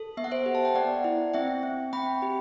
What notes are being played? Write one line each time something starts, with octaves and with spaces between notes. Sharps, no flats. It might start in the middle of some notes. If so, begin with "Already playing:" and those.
Already playing: A4
B3 E5
F#5
C5 E5
G4
A5
G5
B3 D5 F#5
E4
C4 E5 G5
C4
C4 G5 B5
G4